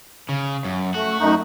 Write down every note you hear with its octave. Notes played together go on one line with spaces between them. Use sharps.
C#3
F#2
A3 F#4
F#2 A3 D#4